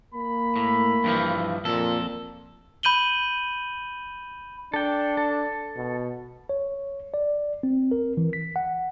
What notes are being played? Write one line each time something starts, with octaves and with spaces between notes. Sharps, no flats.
A#3 B5
A2
G2 E3 F3
F2 A#2 A4
B5 G6 D#7 F#7 G7
D4 A4 G5
A4
B2
C#5
D5
C4
A#4
E3
B6
F#5